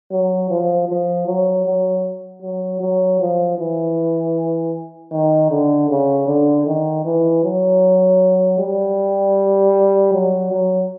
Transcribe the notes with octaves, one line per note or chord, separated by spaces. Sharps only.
F#3
F3
F3
F#3
F#3
F#3
F#3
F3
E3
D#3
D3
C#3
D3
D#3
E3
F#3
G3
F#3
F#3